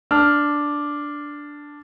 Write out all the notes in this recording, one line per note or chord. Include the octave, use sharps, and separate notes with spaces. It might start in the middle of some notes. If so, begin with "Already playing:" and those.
D4 F6